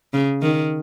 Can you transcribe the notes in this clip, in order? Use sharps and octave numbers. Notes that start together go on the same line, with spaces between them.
C#3
D#3